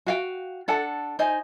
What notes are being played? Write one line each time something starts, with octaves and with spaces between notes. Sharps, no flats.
F#4 F5 G5
D4 A4 F#5 A5
D#4 C5 D#5 G#5